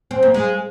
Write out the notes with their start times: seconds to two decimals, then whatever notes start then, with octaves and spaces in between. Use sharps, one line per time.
0.11 C4
0.23 A#3
0.34 G#3